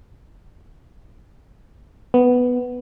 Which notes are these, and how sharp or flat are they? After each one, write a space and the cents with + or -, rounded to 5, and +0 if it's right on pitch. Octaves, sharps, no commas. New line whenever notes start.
B3 +5